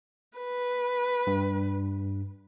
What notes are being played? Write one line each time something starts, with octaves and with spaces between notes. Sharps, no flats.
B4
G2